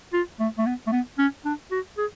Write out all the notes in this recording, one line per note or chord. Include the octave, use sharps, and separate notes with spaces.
F4
A3
A3
B3
A3
B3
C#4
D4
F#4
G#4